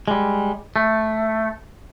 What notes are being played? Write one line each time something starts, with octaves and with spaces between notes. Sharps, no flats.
G3 G#3
A3